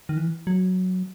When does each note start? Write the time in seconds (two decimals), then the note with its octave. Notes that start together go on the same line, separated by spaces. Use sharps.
0.09 D#3
0.17 E3
0.47 F#3